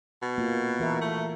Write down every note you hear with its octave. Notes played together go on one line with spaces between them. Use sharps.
B2
A#3 F4
E3 A#4 E5
A3